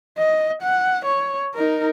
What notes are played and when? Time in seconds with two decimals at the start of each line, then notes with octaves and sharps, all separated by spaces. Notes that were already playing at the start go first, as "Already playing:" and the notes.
0.18 D#5
0.62 F#5
1.05 C#5
1.55 D#4 A#4